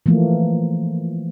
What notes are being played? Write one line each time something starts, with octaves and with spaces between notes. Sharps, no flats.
E3 F3 A3 A#3